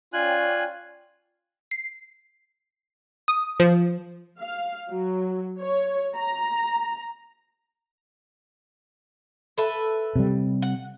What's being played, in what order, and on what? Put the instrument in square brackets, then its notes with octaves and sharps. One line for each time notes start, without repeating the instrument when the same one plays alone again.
[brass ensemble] C#4 D5 G5 [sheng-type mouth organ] F4 G#5 F#6
[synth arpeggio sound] C7
D#6
F3
[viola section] F5
F#3
C#5
A#5
[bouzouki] A4 B4 E5
[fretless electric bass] C3 G3
[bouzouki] F#5